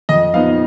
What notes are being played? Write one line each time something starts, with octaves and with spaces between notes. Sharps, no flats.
F2 D#5
F3 B3 D#4 F5